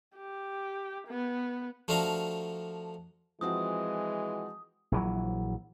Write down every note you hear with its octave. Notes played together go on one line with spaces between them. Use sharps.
G4
B3
F3 A3 D4 F#4 F5 A#5
E3 F3 G#3 C4 F#4 D#6
A#1 E3 F#3